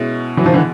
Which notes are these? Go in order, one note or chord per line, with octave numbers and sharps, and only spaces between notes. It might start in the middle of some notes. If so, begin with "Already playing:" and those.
Already playing: B2 G#3 C#4 E4
E3 F#3
D#3 F3
D3 E3